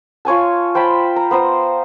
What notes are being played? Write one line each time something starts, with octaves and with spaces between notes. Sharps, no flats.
F4 C#5 G#5 A5
C5 G5 A5 B5
A#5
B3 C5 A#5